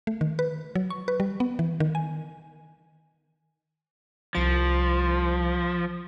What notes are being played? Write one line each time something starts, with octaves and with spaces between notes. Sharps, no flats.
A3
D#3
B4
F#3
C#6
B4
G3
B3
E3
D#3
G#5
C2 F3 A6 D7